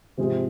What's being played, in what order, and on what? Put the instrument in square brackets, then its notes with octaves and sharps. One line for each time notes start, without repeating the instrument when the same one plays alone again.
[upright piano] G#2 F3 C4 F4 G#4 [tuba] C3